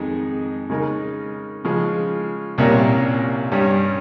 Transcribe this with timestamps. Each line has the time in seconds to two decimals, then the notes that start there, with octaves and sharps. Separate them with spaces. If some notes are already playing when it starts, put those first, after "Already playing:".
Already playing: F2 D#3 G#3 D#4 G#4
0.70 C#3 G#3 D#4 A#4
1.64 C#3 F3 G#3
2.58 C2 A#2 G3 A#3 C#4
3.52 G2 G3 C#4